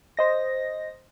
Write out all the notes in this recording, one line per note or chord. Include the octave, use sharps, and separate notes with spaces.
C5 D#5 A#6